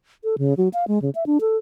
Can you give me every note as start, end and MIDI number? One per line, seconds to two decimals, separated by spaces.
0.24 0.36 69
0.38 0.54 49
0.57 0.69 54
0.74 0.87 77
0.88 1.01 56
1.02 1.10 49
1.15 1.26 76
1.26 1.38 62
1.41 1.57 69